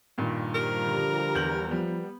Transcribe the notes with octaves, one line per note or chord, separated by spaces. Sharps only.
G2 A#2 D#3
F3 G3 A#4 A#5
D3
E2 G6 F#7
F3 G3 B3